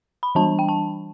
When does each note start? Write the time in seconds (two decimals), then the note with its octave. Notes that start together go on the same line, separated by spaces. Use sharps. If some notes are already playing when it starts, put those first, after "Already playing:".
0.23 B5
0.35 E3 G3 D4 A5
0.59 G5
0.69 A5